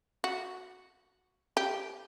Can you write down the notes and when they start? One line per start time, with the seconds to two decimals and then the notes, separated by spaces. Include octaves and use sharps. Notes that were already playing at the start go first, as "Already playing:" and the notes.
0.24 F#4
1.57 G4